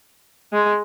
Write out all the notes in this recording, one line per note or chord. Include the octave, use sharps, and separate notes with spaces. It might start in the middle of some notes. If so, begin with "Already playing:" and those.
G#3